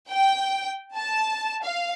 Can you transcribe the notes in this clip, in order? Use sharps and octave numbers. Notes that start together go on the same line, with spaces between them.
G5
A5
F5